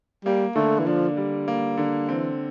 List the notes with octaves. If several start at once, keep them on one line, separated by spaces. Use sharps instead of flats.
G3 A#3
D3 A3
E3
F3 D4
G3
A#3
D3
E3 C4